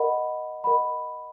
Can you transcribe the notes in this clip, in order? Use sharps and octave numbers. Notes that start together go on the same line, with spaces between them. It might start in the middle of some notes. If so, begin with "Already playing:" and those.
Already playing: A#4 D#5 F#5 B5
A#4 D#5 F#5 B5